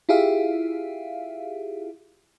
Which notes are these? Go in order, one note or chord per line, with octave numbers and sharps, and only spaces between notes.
E4 F4 G4 G#4 E5 F5